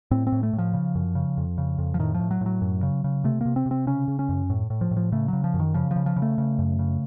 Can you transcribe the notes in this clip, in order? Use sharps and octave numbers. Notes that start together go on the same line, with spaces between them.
A2 C4
C4
A2
A3
A2
F3
C#3
F#2
C#3
F2
C#3
F2
F3
A2 D#3
F3
A2
F#3
A2 F#3
F#2
C#3
C#3
C3 A3
C3 A#3
C4
C3
C4
C#3 C#4
C#3
C#4
F#2
A2
A2
F3
A2
F3
C#3 A3
C#3 F#3
F3
F#2
D#3
C#3 F3
F3
C#3
F3
C#3
A3
C#3
F#2
C#3